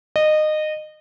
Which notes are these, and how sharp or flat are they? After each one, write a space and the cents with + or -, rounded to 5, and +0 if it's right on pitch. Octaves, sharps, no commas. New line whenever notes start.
D#5 -20